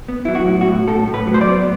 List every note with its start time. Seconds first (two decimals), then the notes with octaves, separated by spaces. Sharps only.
0.08 B3
0.25 F#3 E4
0.35 F#4
0.47 A2
0.61 F#4
0.68 A2
0.88 A2 A4
1.08 A2
1.14 B4
1.27 F#3
1.34 C5
1.41 D5
1.47 B3